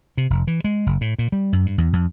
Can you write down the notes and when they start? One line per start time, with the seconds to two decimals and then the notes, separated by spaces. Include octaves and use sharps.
0.17 C3
0.30 F1
0.47 E3
0.64 G#3
0.86 F#1
1.01 A2
1.19 A#2
1.32 G3
1.53 F#2
1.66 G2
1.78 E2
1.93 F2